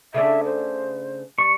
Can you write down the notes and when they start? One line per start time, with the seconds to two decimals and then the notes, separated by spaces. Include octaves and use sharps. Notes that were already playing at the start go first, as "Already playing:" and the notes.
0.14 C#3 A3 D4 E5
0.44 C5
1.38 G3 C#6